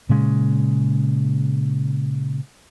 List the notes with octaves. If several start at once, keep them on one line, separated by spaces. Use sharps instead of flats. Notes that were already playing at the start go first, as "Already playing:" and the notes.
A#2 C#3 G#3